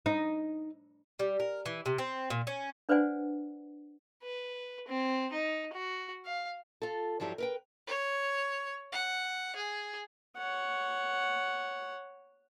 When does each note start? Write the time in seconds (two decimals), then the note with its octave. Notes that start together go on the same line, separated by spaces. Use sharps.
0.06 D#4
1.19 G3
1.40 A#4
1.66 E3
1.86 C3
1.98 C4
2.30 A#2
2.47 C#4
2.89 D4 B4 C5 D5 F#5 G#5
4.23 B4
4.88 C4
5.33 D#4
5.73 F#4
6.25 F5
6.82 F4 A4
7.20 G2 F3 F#3 E4 G4
7.38 A#4 B4 G5
7.87 C#5
8.92 F#5
9.56 G#4
10.37 C#5 F#5